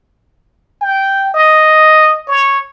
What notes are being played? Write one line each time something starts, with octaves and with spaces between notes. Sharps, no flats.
G5
D#5
C#5